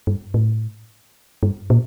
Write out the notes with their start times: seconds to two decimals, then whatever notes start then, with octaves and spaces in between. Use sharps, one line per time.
0.07 G2
0.34 A2
1.43 G2
1.70 A#2